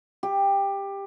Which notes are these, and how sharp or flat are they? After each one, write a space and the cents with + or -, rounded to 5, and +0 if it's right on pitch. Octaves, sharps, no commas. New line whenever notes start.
G4 +15